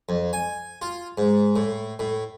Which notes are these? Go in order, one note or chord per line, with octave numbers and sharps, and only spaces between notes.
F2
G#5
F4
G#2
A2
A2